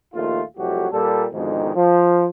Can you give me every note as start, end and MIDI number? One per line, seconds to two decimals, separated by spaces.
0.14 0.42 34
0.14 0.42 39
0.14 0.42 57
0.14 0.42 65
0.57 0.87 36
0.57 0.87 41
0.57 0.87 54
0.57 0.87 57
0.57 0.87 66
0.57 0.87 67
0.92 1.26 46
0.92 1.26 55
0.92 1.26 69
1.33 1.75 41
1.33 1.75 44
1.33 1.75 47
1.33 1.75 50
1.33 1.75 51
1.76 2.28 53